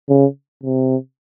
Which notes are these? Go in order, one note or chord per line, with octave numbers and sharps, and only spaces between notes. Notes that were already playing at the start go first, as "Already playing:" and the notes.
C#3
C3